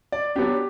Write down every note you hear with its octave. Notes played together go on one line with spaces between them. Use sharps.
D5
F#3 B3 D4 G4